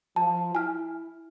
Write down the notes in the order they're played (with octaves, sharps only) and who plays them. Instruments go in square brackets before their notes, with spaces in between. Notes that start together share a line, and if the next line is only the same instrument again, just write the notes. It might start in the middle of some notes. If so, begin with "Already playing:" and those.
[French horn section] F3 [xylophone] A5
[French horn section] E4 [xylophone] G#5 F6